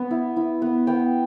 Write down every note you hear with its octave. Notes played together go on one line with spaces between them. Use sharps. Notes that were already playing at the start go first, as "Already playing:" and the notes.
Already playing: B3
E4
E4
B3
B3 G5